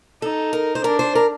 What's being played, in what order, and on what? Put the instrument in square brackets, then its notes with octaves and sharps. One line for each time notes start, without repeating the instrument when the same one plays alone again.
[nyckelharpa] D#4 [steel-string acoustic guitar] A4
[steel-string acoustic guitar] A#4
C5
[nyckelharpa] D4 [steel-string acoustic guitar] A#4
[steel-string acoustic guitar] C5
A#4